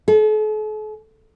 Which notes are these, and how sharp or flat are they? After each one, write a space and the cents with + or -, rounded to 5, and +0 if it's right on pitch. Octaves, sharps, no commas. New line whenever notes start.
A4 -45